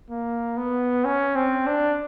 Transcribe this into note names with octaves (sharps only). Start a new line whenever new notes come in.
A#3
B3
C#4
C4
D4